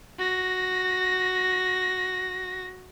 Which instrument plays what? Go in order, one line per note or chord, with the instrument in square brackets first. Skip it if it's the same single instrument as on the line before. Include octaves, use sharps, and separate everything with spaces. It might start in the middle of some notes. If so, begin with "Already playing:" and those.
[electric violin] F#4 A#6